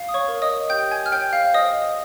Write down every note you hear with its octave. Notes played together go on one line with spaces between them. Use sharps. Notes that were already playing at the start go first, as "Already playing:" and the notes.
Already playing: F5
D#6
C#5 C#6
A#4
D#5 D#6
G4 G5 G6
G#5 G#6
F6
C#5 G5 G6
F5 F6
C5 D#5 D#6